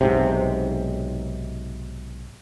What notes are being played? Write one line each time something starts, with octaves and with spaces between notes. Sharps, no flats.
B1 G#2 C3